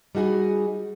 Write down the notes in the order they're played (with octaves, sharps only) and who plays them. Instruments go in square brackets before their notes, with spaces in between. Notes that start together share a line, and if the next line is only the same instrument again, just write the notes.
[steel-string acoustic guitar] G3 D#4 F#4 G#4